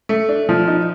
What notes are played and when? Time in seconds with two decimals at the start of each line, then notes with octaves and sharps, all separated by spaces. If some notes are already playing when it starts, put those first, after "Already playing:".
0.09 A3
0.29 D4
0.49 F3
0.68 D#4